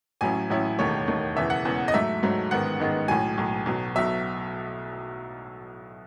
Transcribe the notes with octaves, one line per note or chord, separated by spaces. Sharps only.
A1 A2 F#3 C#4 E4 G#5
A1 A2 F#3 C#4 E4
E1 D#2 D#3 A3 C#5
E1 D#2 D#3 A3
E1 E2 C#3 E3 E5
F#5
E1 E2 C#3 E3
D#5
G#2 F#3 A3 E5
G#2 F#3 A3
A1 G#2 D#3 G#3 B3 F#5
A1 G#2 D#3 G#3 B3
B1 A2 F#3 G#5
B1 A2 F#3
B1 B2 F#3
B1 B2 F#3 E5